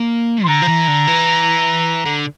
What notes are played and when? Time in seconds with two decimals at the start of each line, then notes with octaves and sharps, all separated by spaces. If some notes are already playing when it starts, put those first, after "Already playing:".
Already playing: A#3
0.44 E3 C6
0.48 D3 A#5
0.62 F3
0.68 E3
0.88 D3
1.07 E3
2.06 D3